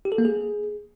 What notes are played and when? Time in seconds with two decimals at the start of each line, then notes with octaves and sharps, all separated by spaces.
0.05 G4
0.12 A4
0.18 A#3
0.25 G#4